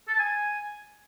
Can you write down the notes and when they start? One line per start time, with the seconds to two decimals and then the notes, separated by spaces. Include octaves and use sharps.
0.08 A4
0.14 A5
0.20 G#5